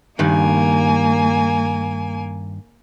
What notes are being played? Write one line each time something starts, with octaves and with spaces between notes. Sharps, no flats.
G2 D#3 A#3 G#5